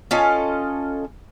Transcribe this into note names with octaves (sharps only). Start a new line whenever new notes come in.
C#4 F4 A4 D#5